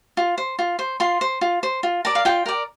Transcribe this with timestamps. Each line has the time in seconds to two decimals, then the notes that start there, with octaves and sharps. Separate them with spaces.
0.17 F4
0.38 C5
0.59 F4
0.79 C5
1.00 F4 C6
1.21 C5
1.41 F4
1.63 C5
1.83 F4
2.05 A#4 D5 A5
2.15 F5
2.25 F4 G5
2.46 A#4 D5